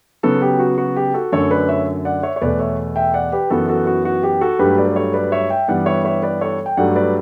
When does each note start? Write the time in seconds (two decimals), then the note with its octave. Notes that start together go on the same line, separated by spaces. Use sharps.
0.23 C#3 F#3 B3 F#4 A4
0.42 G4
0.60 F#4
0.78 F#4
0.96 G4
1.14 F#4 A4
1.32 F#2 D3 A3 A4 C#5
1.51 B4 D5
1.69 C#5 E5
2.05 D5 F#5
2.23 C#5 E5
2.36 C#5
2.41 E2 B2 A3 B4 D5
2.59 C#5 E5
2.96 E5 G5
3.14 D5 F#5
3.32 G4 B4
3.50 F#2 E3 B3 F#4 A4
3.69 F#4 A4
3.87 F#4
4.05 F#4
4.23 G4
4.41 F#4 A4
4.59 G2 F#3 A3 G4 B4
4.78 B4 D5
4.88 B4
4.96 A4 C#5
5.14 B4 D5
5.32 C#5 E5
5.50 E5 G5
5.68 G2 E3 G3 B3 D5 F#5
5.86 C#5 E5
6.05 C#5 E5
6.23 B4 D5
6.41 A4 C#5
6.66 G5
6.77 G2 F#3 A3 D5 F#5
6.96 B4 D5